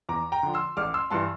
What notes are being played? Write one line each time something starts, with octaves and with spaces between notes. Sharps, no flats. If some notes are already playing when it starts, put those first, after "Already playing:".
E2 A#5 D6
G5 A#5
D3 F3
C6 E6
A1 D6 F6
C6 E6
G2 E3 A5 C6